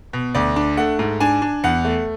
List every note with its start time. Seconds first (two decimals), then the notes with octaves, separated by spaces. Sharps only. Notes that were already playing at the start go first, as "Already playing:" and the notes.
0.13 B2
0.35 D2 D5
0.56 D4
0.77 A3 F#5
0.99 G#2
1.20 D4 G#5
1.42 D4
1.64 E2 F#5
1.85 A3